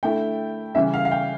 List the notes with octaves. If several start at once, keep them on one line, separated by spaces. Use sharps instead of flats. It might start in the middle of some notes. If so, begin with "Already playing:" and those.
D3 A3 E4 G5
C#3 E3 G3 C#4 E5
F5
F5
G5